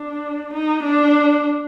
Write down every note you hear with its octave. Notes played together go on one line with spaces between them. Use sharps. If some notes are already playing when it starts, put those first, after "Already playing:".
Already playing: D4
D#4
D4